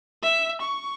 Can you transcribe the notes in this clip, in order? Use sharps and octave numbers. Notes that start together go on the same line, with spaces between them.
E5
C#6